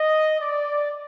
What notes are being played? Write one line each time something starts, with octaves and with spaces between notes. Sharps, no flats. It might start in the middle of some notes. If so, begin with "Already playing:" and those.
Already playing: D#5
D5